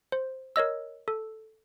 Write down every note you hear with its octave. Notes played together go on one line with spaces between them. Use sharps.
C5
A#4 C#5 D#5 E6
A4